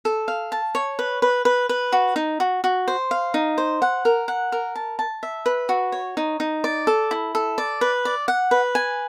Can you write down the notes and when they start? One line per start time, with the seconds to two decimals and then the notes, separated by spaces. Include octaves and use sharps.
0.05 A4
0.28 F5
0.52 A5
0.75 C#5
0.99 B4
1.22 B4
1.45 B4
1.69 B4
1.92 F#4
2.16 D#4
2.40 F#4
2.64 F#4
2.88 C5
3.11 F5
3.34 D#4
3.58 C5
3.82 F#5
4.05 A#4
4.28 F#5
4.52 A#4
4.76 A5
4.99 A5
5.23 E5
5.46 B4
5.69 F#4
5.92 C#5
6.17 D#4
6.40 D#4
6.64 D5
6.87 A4
7.11 E4
7.35 A4
7.58 D5
7.81 B4
8.05 D5
8.28 F#5
8.51 B4
8.75 G#5